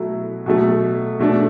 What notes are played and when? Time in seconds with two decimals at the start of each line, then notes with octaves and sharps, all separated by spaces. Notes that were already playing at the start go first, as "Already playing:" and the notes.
Already playing: B2 F#3 A3 E4
0.46 B2 F#3 A3
1.19 B2 A3 D4